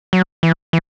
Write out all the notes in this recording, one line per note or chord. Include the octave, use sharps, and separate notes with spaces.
F#3
E3
E3